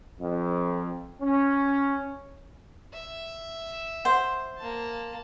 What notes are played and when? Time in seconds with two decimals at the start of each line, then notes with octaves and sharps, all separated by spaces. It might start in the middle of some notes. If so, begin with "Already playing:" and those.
0.20 F2
1.21 C#4
2.93 E5
4.05 C5 F#5
4.58 A#3 A5